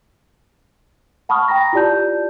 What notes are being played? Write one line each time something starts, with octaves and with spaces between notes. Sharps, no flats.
F#5 A5 B5 C#6 D#6 F6
G5 A#5 A#6
E4 F4 G4 D5 A5 G6